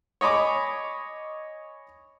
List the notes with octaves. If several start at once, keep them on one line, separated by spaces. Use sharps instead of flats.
C#5 D#5 G#5 B5 D6